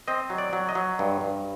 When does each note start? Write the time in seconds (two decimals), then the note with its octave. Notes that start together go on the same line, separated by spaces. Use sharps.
0.08 C4 D#5
0.30 F#3
0.38 D5
0.53 F#3
0.69 D#5
0.75 F#3
0.99 G2
1.21 G2